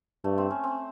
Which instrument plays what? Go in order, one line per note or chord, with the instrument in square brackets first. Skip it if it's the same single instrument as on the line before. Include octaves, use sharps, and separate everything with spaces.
[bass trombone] G2 [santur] A3
[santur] C4
C#4
C4